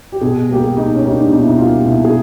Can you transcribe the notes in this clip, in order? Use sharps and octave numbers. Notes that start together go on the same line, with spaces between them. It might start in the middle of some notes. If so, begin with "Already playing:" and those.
G4
B2 G#4
G3 A#3 G4
G#4
B2 D#4
C#4
G3 A#3 D#4
D4
B2 D#4
E4
D#4
G3 A#3 F4
B2 E4
G#4